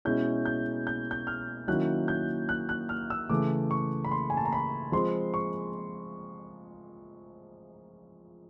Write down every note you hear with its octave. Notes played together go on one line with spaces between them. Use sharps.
B2 G#3 C#4 E4 G6
G6
G6
G6
F6
D#3 F#3 A#3 C#4 E4 F#6
G6
F#6
F#6
F6
E6
C#3 E3 A3 D6
C#6
B5
C6
G#5
A5
A#5
B5
F3 G#3 C4 C6
C#6